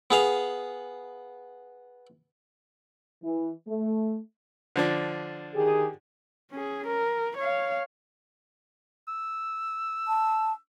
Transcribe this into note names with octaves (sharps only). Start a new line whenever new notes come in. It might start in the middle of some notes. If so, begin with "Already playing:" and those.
B3 G#4 F5
E3
A3
D3 F3 D4
D#3 G4 G#4
C#4 G#4
A#4
C#5 F5
E6
A5